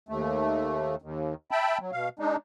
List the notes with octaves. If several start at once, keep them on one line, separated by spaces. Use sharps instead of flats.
D#2 A3
D#2
E5 G5 A5 B5
F#3
B2 F5
G#3 D4 D#4